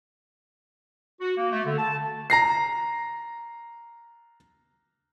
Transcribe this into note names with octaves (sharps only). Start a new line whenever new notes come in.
F#4
A#3
A3
D3
A5
A#5 A#6 C7